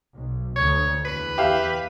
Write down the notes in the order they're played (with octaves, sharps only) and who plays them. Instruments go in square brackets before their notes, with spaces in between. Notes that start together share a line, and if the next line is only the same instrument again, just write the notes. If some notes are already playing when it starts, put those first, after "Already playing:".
[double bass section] B1
[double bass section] D2 [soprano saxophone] C#5
[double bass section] E2 [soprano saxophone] B4
[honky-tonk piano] G4 E5 F5